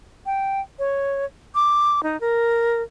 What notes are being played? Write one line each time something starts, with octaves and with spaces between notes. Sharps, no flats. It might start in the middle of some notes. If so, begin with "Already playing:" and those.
G5
C#5
D6
D#4
A#4